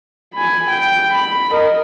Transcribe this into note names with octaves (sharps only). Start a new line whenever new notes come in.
G#5 B5
G5
B5
A#4 D#5